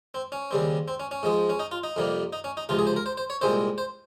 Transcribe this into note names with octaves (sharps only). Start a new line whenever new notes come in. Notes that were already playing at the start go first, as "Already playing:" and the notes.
C4
C#4
D#2 C#3 G3 C4
C4
C#4
C#4
G#2 F3 G#3
C#4
D#4
F4
D#4
F2 C3 G3 A#3
D#4
C#4
D#4
C#2 C3 F3 F4
G#4
C5
A#4
C5
C5
C#5
C2 A#2 G#3 C4 C5
C5